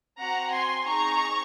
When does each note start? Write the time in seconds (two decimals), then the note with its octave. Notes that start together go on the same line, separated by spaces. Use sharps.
0.18 C4 F#4 F#5 A#5
0.52 G#5 C6
0.85 C4 D#4 G#4 A#5 C#6